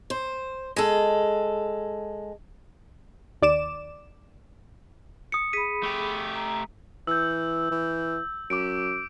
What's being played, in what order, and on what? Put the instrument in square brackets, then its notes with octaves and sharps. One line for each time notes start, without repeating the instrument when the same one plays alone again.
[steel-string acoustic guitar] C5
G#3 A4
[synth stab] D#2 D5 D6 E7
[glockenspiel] D#6 C#7
[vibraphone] G#4 B5 [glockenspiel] B6 D#7
[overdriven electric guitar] A3 G4
[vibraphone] A#5
[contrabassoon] E3 [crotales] E6 G6
[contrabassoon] E3
[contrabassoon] F#2 [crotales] D6 D7